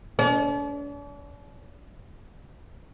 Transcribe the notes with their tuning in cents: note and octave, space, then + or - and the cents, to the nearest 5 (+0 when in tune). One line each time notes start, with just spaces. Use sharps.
D4 -45